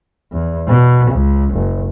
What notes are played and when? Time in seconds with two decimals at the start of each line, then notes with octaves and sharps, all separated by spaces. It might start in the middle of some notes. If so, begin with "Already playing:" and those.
0.32 E2
0.68 B2
1.11 C#2
1.54 F#1